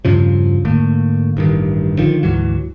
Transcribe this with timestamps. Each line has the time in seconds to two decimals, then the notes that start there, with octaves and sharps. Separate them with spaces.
0.05 E2 G2 C#3 F3
0.65 G#2 D3 A3 A#3
1.37 A1 G2 D#3
1.98 D3 D#3 F3
2.23 D2 G#2 E3 F#3